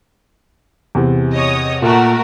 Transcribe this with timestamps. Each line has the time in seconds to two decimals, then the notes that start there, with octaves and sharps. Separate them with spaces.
0.95 E2 C3
1.36 C#5 D#5 D#6
1.82 A#2 A3 F#4 A#4